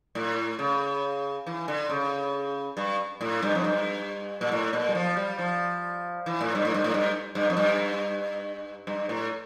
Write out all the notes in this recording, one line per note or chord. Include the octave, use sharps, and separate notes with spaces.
A2
C#3
E3
D3
C#3
G2
A2
G2
F2
G2
A#2
A2
A#2
G3
F3
G3
F3
E3
A2
G2
A2
G2
A2
G2
G2
F2
G2
G2
A2